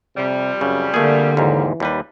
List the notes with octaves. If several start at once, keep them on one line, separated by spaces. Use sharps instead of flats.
F2 C3 G3
F#2 C#3
D3 A3 A#3 G#4
D#2 G#2 E3
D#2 G3 B4